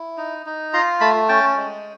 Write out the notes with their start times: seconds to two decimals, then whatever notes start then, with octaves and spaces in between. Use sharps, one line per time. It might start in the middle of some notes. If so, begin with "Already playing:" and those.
Already playing: E4
0.17 D#4
0.46 D#4
0.73 F4 A#5 C6
1.01 A3 A5 B5
1.29 C#4 G5 A5
1.57 G#3